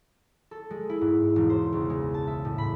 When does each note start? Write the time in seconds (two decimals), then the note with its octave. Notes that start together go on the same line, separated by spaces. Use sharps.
0.51 A4
0.70 G#3
0.90 E4
1.01 G#2
1.36 E1
1.50 C5
1.72 C#2
1.90 G#3
2.14 A5
2.27 E5
2.45 A2
2.58 B5